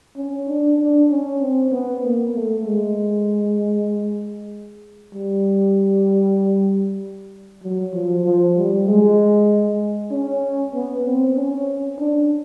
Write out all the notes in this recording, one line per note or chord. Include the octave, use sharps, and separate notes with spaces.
C#4
D4
D4
C#4
C4
B3
A#3
A3
G#3
G3
F#3
F3
F3
G3
G#3
C#4
B3
C4
C#4
D4